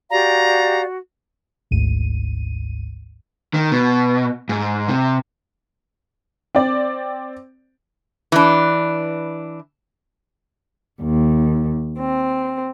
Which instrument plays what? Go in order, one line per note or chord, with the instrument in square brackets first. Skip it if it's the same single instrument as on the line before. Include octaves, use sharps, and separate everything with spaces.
[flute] F#4 [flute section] G4 D5 F5 [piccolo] A#5
[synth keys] G#1 D2 G#2 D#7
[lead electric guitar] D#3
B2
G#2
C3
[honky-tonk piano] C4 D5
[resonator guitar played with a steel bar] E3 D4
[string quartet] D#2
C4